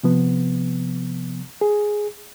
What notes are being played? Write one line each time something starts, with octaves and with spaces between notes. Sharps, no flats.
C3 F3 B3
G#4